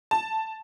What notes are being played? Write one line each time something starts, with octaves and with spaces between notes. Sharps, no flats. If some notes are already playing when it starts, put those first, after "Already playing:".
A5